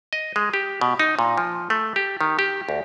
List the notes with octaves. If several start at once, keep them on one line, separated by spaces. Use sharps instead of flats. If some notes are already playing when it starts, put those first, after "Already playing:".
D#5
G#3
G4
B2
D#4
A#2
F3
A3
G4
D#3
G4
D2